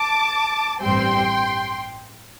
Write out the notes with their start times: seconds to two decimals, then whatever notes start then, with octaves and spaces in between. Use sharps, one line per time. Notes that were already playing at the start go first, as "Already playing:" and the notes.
Already playing: A5 D6
0.81 A1 G2 G3 C4 G5 C6